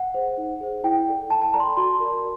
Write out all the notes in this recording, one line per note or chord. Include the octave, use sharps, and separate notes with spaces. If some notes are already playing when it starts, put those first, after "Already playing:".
Already playing: F#5
G#4 C5
D#4
G#4 C5
E4 G5
A4 D5
E4 A5
A5
A4 D5 A#5
C6
B5
F#4 C6
A#4 D5